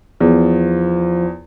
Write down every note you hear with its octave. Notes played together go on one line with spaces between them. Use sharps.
E2 F3